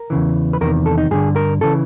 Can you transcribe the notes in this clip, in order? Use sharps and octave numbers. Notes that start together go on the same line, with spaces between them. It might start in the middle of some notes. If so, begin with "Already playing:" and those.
Already playing: A#4
E2 C#3 E3
B4
E2 C3 D#3 A#4
A4
D#4
G2 D3 G#4
A#4
C#3 E3 A4